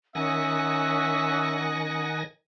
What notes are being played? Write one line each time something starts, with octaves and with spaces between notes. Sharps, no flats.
D#3 C#4 E5 F#5 G#5 D#6 F#6 A#6